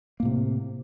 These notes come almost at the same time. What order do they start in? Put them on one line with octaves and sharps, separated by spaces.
A#3 A2 C3